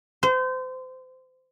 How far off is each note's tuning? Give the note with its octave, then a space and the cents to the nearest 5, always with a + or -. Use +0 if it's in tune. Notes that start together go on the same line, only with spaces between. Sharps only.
C5 -30